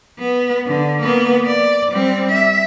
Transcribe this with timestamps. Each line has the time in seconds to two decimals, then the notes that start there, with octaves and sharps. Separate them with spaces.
0.19 B3
0.67 D3
1.02 A#3 B3
1.46 D5
1.92 G3 C4
2.32 E5